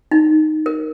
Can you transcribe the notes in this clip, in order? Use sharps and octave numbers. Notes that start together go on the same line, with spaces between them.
D#4
A#4